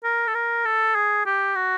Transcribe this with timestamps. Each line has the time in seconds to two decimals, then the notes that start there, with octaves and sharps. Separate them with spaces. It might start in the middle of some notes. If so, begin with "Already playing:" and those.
0.04 A#4
0.28 A4
0.35 A#4
0.65 A4
0.95 G#4
1.26 G4
1.55 F#4